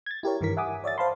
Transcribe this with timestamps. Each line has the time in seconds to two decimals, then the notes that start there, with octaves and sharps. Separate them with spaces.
0.06 G#6 A6
0.23 E4 G4 A#4 C#5
0.41 G2 D#3 E3 A#4 B6
0.57 E5 F#5 G#5 D6 D#6
0.84 C#5 D5 E5 A6
0.98 C5 F5 A5 B5 C6